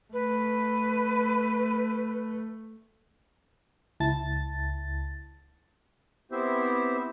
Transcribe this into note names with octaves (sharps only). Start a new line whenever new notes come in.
A3 B4
C#2 E4 A5 A6
B3 C4 E4 G4 C5 E5